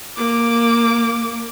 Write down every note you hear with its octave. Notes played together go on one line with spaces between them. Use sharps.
A#3 D6